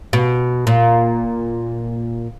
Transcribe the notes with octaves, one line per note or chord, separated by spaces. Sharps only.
B2
A#2